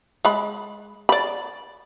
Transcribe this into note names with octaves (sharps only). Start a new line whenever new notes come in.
G#3 B5
D5 B5